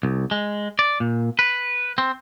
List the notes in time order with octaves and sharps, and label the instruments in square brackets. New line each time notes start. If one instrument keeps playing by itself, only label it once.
[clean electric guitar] C2
G#3
D5
A#2
B4
C4